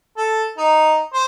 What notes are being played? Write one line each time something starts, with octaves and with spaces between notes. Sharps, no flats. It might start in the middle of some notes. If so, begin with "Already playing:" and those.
A4
D#4
C5